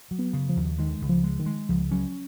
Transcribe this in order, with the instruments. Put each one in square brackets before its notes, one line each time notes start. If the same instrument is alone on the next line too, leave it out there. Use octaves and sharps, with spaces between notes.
[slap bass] F#3
[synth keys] B3
[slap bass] C#3
[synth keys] F3
[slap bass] D#2
[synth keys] D#3 [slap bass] G#3
[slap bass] C#2
[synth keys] F3
[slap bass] G#3
[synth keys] D#3
[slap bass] G#3
[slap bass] C#2 [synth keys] F3
[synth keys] F#3 [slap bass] C#4